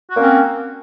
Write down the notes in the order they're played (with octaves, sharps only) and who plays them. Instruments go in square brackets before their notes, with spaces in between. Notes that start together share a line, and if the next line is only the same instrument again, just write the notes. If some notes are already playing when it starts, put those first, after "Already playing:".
[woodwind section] F#4
A#3
C#4
C4